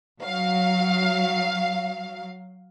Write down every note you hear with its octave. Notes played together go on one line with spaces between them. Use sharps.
F#3 F5